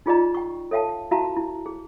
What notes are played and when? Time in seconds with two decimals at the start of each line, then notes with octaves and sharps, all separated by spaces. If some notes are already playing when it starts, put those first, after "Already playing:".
0.06 D#4 F4 G#4 D5 D#5 A#5
0.35 G5 C#6
0.71 A4 C#5 E5 F5 G5 A5
1.11 E4 F#4 E5 F5 A5 A#5
1.37 E4
1.66 G#4